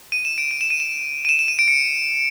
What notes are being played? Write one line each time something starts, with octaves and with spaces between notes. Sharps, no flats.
D#7
E7
D7
D#7
E7
D#7
E7
D#7
E7
E7
D#7
D7
C#7